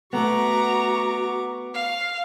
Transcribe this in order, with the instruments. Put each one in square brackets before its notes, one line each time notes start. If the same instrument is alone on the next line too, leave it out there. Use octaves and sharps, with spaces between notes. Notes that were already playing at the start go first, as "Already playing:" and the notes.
[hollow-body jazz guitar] A3 B3 [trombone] F#4 [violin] A#5 [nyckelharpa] C#6 D6
[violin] F5